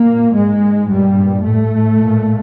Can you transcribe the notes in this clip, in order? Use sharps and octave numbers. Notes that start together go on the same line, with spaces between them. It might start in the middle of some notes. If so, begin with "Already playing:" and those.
Already playing: A#2 A#3
G#2 G#3
G2 A#2 G3
A2 A3
A#2